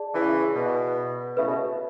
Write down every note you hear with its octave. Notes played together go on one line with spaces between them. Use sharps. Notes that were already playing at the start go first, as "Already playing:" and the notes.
Already playing: G#4 D5 A5
C#3 E3
B2
A2 C#3 B4 E5 B5
B2